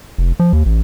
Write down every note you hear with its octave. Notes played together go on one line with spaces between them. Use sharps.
F1
F3
D#2
A1